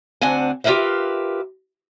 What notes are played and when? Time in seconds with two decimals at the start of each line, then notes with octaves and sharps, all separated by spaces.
0.21 D2 C4 D4 F#5 G#5
0.64 F4 G4 G#4 A#4 B4 E5